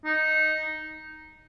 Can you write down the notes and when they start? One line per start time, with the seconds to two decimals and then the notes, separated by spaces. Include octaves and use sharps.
0.05 D#4